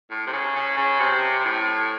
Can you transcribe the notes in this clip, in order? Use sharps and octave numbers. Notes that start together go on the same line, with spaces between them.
A2
C3
C#3
C#3
C#3
C3
C3
A2